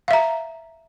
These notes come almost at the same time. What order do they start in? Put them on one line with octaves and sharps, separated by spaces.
F5 E5 A#5